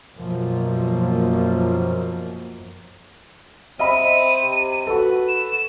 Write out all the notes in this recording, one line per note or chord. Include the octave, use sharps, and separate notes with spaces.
F#2 B2 F3 A#3
C4 D#5 E5 B5 D#7
C3
F#4 A4 B4
E7